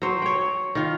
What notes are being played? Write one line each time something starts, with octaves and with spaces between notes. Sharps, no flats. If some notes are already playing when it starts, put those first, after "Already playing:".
F#3 C5
C#5 G5
D#3 F4